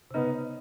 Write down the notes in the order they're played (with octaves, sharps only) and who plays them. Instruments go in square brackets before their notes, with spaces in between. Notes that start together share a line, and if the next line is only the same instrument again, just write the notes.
[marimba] C3
[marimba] C#3 [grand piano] B3 D#4